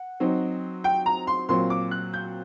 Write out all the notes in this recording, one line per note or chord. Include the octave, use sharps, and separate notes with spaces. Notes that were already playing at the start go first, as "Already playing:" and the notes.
Already playing: F#5
F#3 C4 D#4
G5
A#5
C6
A#2 F#3 C4 C6
D6
F#6
G6